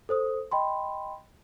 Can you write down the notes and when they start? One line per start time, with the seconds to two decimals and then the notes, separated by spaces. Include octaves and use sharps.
0.09 A4 C5 D#6
0.51 D#5 G5 B5 C6